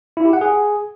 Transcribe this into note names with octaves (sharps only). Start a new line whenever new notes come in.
E4
G4
F#5
G#4